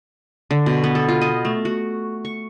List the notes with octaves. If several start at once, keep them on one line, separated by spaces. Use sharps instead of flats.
D3
B2
B3
A4
F4
D#5
A3
F#4
C#6